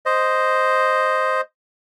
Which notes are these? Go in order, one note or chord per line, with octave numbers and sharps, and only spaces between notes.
C5 D#5